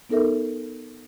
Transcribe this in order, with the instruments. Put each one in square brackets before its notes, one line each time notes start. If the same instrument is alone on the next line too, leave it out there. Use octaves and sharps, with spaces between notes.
[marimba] B3 D#4 A4 A#4 E5